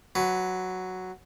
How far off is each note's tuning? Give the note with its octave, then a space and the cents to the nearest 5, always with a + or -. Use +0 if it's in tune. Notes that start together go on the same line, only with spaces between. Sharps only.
F#3 +0 B4 +15